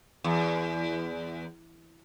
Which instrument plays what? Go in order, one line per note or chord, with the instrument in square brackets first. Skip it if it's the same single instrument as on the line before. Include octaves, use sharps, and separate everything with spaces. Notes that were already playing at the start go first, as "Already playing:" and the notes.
[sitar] E2